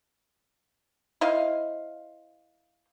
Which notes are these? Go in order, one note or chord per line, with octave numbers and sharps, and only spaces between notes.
E4 C5 D#5 F5